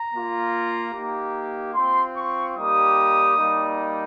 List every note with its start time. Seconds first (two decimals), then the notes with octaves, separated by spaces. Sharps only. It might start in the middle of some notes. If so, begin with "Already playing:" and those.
Already playing: A#5
0.12 A#3 F4
0.93 A#3 D#4 G4
1.75 C4 F4 C6
2.16 C#6
2.56 G3 A#3 D#4 G4 D#6
3.38 G3 A#3 D#4